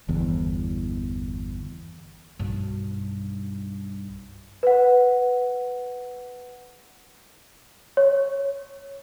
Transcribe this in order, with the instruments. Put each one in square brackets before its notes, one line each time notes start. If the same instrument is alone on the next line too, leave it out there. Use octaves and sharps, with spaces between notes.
[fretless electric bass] G1 E2
[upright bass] B1 G2
[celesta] B4 F#5
C#5